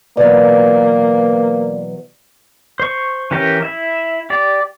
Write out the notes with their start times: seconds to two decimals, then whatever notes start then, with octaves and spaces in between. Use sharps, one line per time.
0.17 B2 E3 F#3 A#3 B4 D5
2.80 C5 C#6
3.31 E3 C#4 G4 A#4
3.62 E4 E5
4.30 G4 D5